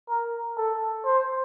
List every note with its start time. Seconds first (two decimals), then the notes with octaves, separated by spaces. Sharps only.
0.09 A#4
0.57 A4
1.05 C5